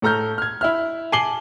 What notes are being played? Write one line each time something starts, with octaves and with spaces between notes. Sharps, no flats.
A2 A4 A#5 F6 G6
F6 G#6
E4 E5 F6
G#5 A5 D6 C7 F#7 G7